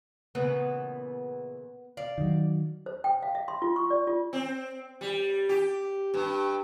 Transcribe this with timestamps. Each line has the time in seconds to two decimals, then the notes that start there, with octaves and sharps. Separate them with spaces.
0.35 A#2 C#3 E3 B3
1.97 D5 F5
2.18 D#3 F#3
2.86 C5
3.04 G5
3.22 F5
3.35 E5
3.48 C6
3.62 F4
3.76 C#6
3.90 D5
4.07 F4
4.33 C4
5.01 G3
5.49 G4
6.14 G2